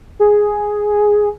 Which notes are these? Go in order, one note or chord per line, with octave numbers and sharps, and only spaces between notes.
G#4